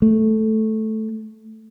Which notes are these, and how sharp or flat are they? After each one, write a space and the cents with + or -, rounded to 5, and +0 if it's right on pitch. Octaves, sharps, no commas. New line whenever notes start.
A3 -5